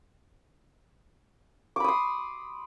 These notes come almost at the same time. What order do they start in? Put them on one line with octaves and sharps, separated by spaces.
D6 B5 D#6 C6